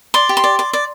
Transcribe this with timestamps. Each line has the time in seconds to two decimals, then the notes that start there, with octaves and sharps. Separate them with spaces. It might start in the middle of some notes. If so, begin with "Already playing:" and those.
0.14 D5 C6
0.29 G4
0.37 C6
0.44 D5
0.59 D5
0.73 D5